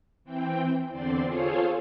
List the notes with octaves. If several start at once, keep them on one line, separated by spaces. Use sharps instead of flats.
E3 C4 G5
E2 D3 C4 D5 C6
F4 G#4 A4 C5 C#5 F5